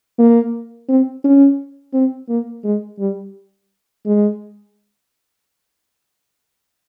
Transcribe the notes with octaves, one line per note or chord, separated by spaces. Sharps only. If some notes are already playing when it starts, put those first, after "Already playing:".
A#3
C4
C#4
C4
A#3
G#3
G3
G#3